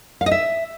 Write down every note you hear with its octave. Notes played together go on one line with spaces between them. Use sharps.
F5
D#5
E5